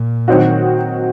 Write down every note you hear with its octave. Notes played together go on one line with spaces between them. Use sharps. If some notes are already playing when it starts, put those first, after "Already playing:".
Already playing: A#2
D#3 F#3 C4 D#4 F#4